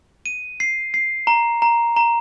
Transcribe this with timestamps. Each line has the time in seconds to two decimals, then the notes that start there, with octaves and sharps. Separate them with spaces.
0.26 D#7
0.60 C7
0.94 C7
1.27 A#5
1.62 A#5
1.96 A#5